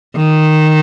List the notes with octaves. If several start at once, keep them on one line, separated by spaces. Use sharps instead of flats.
D#3